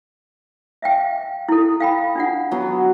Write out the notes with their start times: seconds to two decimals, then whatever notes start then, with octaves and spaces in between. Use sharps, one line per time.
0.82 E5 F5 G5
1.49 E4 A4
1.80 F5 G5 B5
2.15 D4 F4 F#5
2.51 F#3 B3